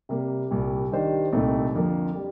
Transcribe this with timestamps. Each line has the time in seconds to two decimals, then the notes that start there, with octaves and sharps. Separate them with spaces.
0.09 C3 G3 A#3
0.51 C2 A#2 G3
0.92 D#3 G3 D4 G4 C5
1.33 C2 A#2 A3 C4 D#4
1.74 F2 D3 F3 A#3
2.15 G3